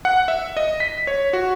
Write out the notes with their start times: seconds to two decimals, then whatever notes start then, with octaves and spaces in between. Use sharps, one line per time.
0.05 F#5
0.28 E5
0.57 D#5
0.80 B6
1.07 C#5
1.33 F#4